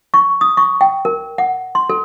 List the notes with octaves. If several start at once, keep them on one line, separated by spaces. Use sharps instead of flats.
C#6
D#6
C#6
G5
A#4
F#5
C6
A4